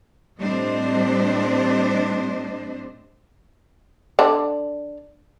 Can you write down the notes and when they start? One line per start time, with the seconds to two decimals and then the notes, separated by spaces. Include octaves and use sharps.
0.40 A2 G3 C4 D4 C5 D#5
4.19 D3 D4